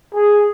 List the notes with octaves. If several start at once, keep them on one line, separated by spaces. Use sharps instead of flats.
G#4